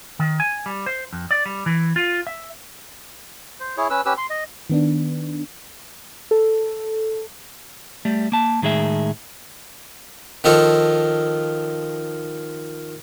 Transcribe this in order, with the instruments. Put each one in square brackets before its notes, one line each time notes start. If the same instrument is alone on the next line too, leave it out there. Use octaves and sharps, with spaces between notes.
[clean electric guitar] D#3
G#5
G3
C5
F2
D5
G3
E3
F4
E5
[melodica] C5
E4 G#4 C#5
C#4 B4 E6
C#4 G4 B4 E6
C6
D#5
[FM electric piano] D#3 B3 D4
[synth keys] A4
[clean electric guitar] G3 A3
A#3 A5
A2 D#3 G#3 G#4 E5
[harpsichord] D#3 F3 D#4 F4 A4 C#5